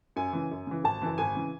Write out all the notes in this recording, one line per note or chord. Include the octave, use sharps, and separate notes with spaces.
F#2 G#5
C#3 E3
F#2
C#3 E3
G#1 A5
F#2 C#3 E3
G#1 G#5
C#3 E3